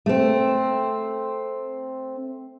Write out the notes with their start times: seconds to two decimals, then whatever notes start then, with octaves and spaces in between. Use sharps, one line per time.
0.06 A3 C4